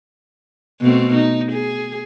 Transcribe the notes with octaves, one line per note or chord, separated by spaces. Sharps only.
B2 A3 C4
D#4
G#4